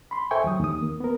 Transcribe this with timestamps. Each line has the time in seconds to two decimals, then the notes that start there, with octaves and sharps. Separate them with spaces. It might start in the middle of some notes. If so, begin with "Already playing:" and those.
0.11 B5 C6
0.31 A4 C5 E5 G5 G#5 C#6
0.44 D#2 F#3 D#6
0.60 D#2 D#6
0.82 A#3
1.00 B3 A#4